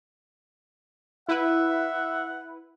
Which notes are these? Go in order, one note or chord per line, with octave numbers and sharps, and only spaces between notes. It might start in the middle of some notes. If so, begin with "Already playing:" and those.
E4 B4 E5 F#5